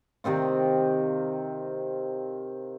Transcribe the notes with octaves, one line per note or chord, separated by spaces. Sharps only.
C3 D#3 C4 F4